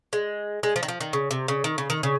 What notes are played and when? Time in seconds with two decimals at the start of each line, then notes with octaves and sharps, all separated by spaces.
0.13 G#3
0.63 G#3
0.76 F3
0.83 D#3
0.88 F3
1.01 D#3
1.13 C#3
1.31 C3
1.48 C#3
1.64 D#3
1.78 C#3
1.90 D#3
2.03 C#3